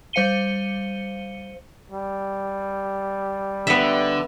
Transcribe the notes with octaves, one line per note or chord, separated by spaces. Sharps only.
G3 C5 F5 C#7 D#7 G7
G3
D3 B3 E5